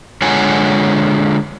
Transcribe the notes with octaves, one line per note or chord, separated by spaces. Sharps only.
D3 G#3 F4 C#5 F#5 G#5